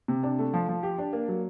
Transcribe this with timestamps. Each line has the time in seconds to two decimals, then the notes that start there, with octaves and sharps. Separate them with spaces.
0.08 C3
0.23 D4
0.39 A3
0.54 F3
0.69 F3
0.83 G4
0.98 D4
1.13 A#3
1.28 F#3